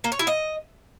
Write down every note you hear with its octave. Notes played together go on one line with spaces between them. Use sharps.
A#3
C#5
E4
D#5